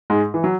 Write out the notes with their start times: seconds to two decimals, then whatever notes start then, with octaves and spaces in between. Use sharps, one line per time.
0.10 G#2 G#3
0.34 E3
0.44 F#3